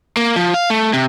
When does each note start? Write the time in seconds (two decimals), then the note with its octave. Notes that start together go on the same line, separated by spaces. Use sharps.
0.17 A#3
0.36 F3
0.54 F5
0.70 A3
0.93 C3